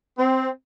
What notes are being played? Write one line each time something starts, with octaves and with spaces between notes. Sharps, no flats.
C4